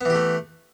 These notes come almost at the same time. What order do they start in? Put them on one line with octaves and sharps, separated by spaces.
B3 E3 G4 A3